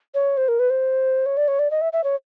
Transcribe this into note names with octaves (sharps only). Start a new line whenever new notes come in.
C#5
C5
A#4
B4
C5
C#5
D5
C#5
D5
D#5
E5
E5
C#5